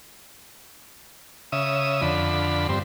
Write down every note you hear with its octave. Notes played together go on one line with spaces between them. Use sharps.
C#3 E5 D#6
F2 D3 B5
G2 C4